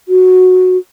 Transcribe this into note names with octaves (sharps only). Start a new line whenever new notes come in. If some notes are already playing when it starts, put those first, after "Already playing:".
F#4